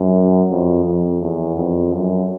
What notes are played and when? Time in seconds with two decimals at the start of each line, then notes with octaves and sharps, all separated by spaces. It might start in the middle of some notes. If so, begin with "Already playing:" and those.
Already playing: F#2
0.50 F2
0.85 F2
1.21 E2
1.57 F2
1.93 F#2